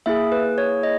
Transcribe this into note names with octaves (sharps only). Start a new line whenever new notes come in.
A#3 E4 G#4 E5
B4
C#5
D#5